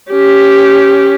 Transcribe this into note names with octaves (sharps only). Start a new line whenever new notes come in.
C#4 G4